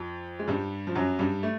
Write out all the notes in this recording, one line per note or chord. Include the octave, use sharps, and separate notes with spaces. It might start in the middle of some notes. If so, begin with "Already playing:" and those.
Already playing: F2 F3
G#3
G2 G3
F3
F#2 F#3
G2 G3
A3